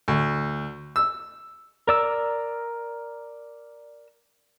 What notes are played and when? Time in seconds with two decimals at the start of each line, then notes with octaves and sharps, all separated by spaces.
0.08 D2
0.96 E6
1.87 A#4 D5 E6